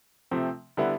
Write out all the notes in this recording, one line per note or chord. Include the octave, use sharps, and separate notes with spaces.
C3 F3 A3 C4
D3 G3 B3 E4